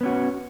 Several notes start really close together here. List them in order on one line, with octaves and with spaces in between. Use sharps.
B3 C#4 F#4